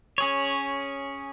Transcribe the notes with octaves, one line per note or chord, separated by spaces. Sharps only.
C#4 G#4 C#5